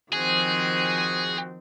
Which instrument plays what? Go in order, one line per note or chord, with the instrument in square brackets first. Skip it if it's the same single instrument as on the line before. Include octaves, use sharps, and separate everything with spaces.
[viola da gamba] D#3 F3 C4 [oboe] F#4 [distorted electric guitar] G#4